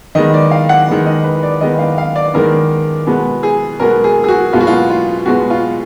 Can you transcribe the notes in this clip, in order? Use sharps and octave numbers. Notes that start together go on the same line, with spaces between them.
D#3 G#3 B3 D#5
D5
F5
F#5
D#3 G#3 B3
D#5
B4
D5
D#3 G#3 B3 D#5
F5
F5
D5
D#3 G#3 B3 A#4
B2 G#3 B3
G#4
B2 G#3 B3 A#4
G#4
G#4
F#4
B2 G#3 B3 F4
F#4
F4
F4
B2 G#3 B3 F#4
F4